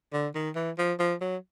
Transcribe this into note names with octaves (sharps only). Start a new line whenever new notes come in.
D3
D#3
E3
F3
F3
F#3